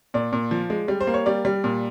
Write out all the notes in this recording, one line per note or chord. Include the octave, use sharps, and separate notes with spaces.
A#2 D5
A#2
F3
G#3
G3
C5
A#3
C#5
G3 D5
G3
A#2